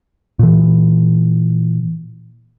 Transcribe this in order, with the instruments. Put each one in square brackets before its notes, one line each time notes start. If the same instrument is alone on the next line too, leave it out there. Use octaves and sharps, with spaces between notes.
[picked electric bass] A#2 E3